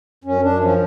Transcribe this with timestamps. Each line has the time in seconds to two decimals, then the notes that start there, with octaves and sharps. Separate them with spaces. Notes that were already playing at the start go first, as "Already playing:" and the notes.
0.24 F#2 C#4
0.42 F#2 D4
0.60 F3 C#4